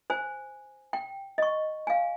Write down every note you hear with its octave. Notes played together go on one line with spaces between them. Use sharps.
C5 G#5
G5
D#5 C#6
F5 G#5